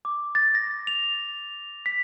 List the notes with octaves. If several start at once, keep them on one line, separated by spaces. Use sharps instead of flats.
D6
A6
A#6
F7
B6